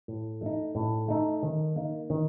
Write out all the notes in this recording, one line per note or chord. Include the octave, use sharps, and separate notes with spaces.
A2
A3 D#4
A2
A3 D#4
D#3
A#3 D#4
D#3